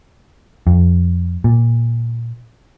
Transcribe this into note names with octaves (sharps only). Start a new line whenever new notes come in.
F2
A#2